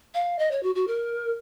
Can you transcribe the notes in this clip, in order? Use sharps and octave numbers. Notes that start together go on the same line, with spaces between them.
F5
D#5
C#5
F#4
F#4
A#4